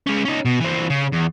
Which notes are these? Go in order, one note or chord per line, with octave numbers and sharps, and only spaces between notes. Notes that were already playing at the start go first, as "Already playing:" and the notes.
G#3 C#4
C#4 D#4
B2
E3 C4
C#3
E2